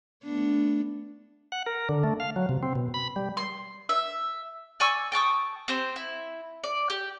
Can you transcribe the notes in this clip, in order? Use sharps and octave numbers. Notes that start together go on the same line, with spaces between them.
A3 B3 D4
F#5
A#4
D3
A3
F5
F#3
C3
C4
B2
B5
G3
C6
E5
D5 G#5 C#6 E6
G5 A5 C#6 D#6
C4 G4 C5
E4
D5
G4